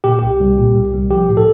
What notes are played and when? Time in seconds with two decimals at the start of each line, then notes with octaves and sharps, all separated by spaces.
0.04 A#2 G4
0.19 C2 G4
0.40 C2
0.58 A#2
0.76 C2
0.93 C2
1.10 F3 G4
1.29 A2
1.37 A4